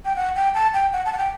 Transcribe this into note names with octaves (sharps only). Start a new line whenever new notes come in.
G5
F#5
G5
A5
G5
F#5
A5
F#5
G5